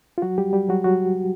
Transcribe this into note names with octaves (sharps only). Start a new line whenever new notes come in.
F4
F#3 F#4
G3 G4
G3 G4
F#3 F#4
F#3 F#4